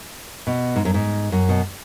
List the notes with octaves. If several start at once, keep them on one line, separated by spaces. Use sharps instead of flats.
B2
G#2
F#2
G#2
F#2
B2